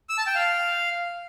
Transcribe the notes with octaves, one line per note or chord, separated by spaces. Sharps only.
E6
A5
G5
F5